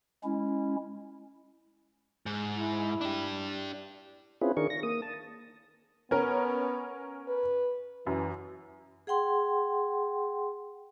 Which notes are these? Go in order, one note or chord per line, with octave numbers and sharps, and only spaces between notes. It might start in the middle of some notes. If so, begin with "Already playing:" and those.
G#3 C#4 E4
G#2
E4
D4 G4
C4 C#4 E4 F4 G#4 B4
D#3 D4 G#4 A#4 C#6
A#6
A#3 D#6
A5
B3 C#4 A#4
B4
F#2 E3
G#4 F#5 G5 C6